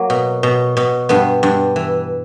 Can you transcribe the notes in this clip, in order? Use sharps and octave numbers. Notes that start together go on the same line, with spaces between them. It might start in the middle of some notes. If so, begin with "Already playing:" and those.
Already playing: F#3 A#3
B2
B2
B2
G2 B3
G2
E3